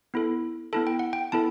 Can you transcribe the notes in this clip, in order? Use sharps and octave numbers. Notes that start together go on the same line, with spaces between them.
B3 E4 A4
B3 E4 A4 A5
G5
F#5
G5
B3 E4 A4 A5